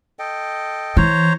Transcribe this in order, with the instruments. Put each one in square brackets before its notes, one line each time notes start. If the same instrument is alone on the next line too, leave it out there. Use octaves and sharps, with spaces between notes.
[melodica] A4 D#5 G5
[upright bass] E3 [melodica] C5 C#5 A#5